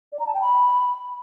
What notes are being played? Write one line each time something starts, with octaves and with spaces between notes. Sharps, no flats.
D5
A#5
A5
G5
B5